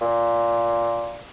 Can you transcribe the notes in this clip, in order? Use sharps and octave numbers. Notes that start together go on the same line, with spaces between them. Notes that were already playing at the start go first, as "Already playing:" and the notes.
A#2